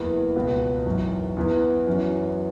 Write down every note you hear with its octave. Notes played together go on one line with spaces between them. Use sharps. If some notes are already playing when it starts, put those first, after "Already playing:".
Already playing: F#1 E2 E3
C#2 B2 B3
G#1 F#2 E3
E2 E3 B3
F#2 E3 C#4 F#4